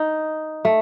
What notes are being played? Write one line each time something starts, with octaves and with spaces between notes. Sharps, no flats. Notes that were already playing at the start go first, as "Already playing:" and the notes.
Already playing: D#4
A3